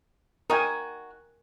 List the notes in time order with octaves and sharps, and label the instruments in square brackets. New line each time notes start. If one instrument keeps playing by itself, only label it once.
[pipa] D#4 F#4 [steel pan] A#4 G5 G#5